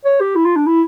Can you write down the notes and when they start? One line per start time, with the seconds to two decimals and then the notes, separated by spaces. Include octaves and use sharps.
0.05 C#5
0.21 G4
0.36 E4
0.46 F4
0.56 D4
0.66 E4